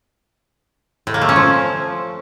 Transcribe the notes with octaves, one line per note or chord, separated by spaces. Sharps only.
A2
A#3
A3
C#4
F3